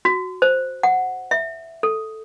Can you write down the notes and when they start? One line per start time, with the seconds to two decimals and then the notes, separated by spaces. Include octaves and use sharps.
0.05 F#4
0.42 C5
0.83 F#5
1.31 E5
1.83 A4